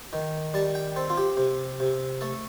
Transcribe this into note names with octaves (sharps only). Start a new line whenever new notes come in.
D#3
G3 A5
G5
C4 A4
F4
G4
C3
C3
A3 A4